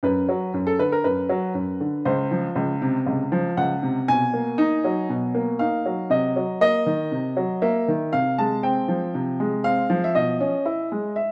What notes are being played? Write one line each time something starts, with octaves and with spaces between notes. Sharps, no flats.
F#2 B4
F#3
F#2
A4
D3 B4
A#4
F#2 B4
F#3
F#2
D3
C#2 C5
F3
C#2
C3
C#2
F3
C#2 F#5
C3
B2 G#5
A#3
D#4
F#3
B2
A#3
D#4 F5
F#3
C3 D#5
F#3
A#3 D#5
D#3
C3
F#3
A#3 E5
D#3
C3 F5
G#3 A5
C4 G5
F3
C3
G#3
C4 F5
F3
E5
B2 D#5
C#4
E4
G#3
E5